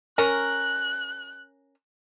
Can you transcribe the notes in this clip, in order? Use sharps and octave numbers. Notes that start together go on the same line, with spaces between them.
C#4 A#4 F#6